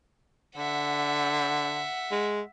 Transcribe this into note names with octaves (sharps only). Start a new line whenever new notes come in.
D3 E5 F#5
G#3